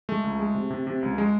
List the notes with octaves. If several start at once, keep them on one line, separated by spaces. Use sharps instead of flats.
G#3 A3
C#2
G#3
C3
C3
C3
C#2
G#3